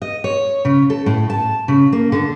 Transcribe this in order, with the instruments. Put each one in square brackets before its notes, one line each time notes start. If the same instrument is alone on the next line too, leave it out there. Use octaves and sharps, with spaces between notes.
[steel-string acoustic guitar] D#5
C#5
C#3
A4
A2
A5
C#3
A#3
D3